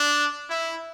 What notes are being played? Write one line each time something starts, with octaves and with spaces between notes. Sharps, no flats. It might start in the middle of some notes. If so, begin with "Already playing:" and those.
Already playing: D4
E4